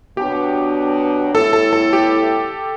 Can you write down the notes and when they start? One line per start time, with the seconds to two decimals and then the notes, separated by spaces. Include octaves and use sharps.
0.17 B2 F#3 B3 D4 G4
1.34 A2 G3 B3 E4 A4
1.53 A4
1.73 A4
1.93 G4